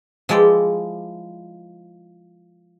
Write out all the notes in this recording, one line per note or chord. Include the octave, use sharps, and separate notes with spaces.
F3 G#3 E4 D5 G5